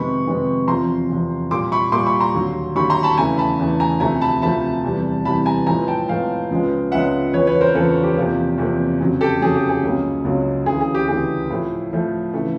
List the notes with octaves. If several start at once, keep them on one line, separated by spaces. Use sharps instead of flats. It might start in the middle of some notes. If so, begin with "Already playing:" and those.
Already playing: F2 C3 D#3 G#3 B3 B5 C#6
F2 C3 D#3 G#3 B3
E2 C3 F3 A#5 C6
E2 C3 F3
A#2 G3 A#3 C6 D6
B5 C#6
A#2 G3 A#3 C6 D6
B5 C#6
A#5 C6
D#2 D3 F#3
D#2 D3 F#3 B5 C#6
A#5 C6
A5 B5
E2 C#3 E3 A3 G#5 A#5
A5 B5
E2 C#3 E3 A3
G#5 A#5
D2 C3 F3 A3 G#5 A#5
A5 B5
D2 C3 F3 A3 A5 B5
E2 C3 E3 G3
E2 C3 E3 G3 A5 B5
G#5 A#5
A2 F3 G#3 B3 G#5 A#5
G5 A5
A2 F3 G#3 B3 F5 G5
C#2 C#3 F3 G#3 B3
C#2 C#3 F3 G#3 B3 E5 F#5
E2 C#3 F3 B4 C#5
B4 C#5
A#4 C5
E2 C#3 F3 A4 B4
G4
E2 C3 F3 A#3
E2 C3 F3 A#3
F2 C#3 F#3
G4 A4
F2 C#3 F#3 G#4
G4
G#4
C#2 C#3 F#3 A#3
C#2 C#3 F#3 A#3
D2 C#3 E3 G#4
G#4
G4
D2 C#3 E3 G#4
A2 F3 A3
A2 F3 A3
C#3 E3 A3